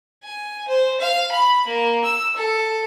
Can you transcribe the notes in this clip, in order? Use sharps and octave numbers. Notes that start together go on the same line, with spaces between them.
G#5
C5
F5
B5
A#3
E6
A4